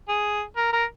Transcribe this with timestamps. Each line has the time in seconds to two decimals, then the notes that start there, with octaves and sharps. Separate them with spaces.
0.08 G#4
0.57 A#4
0.73 A#4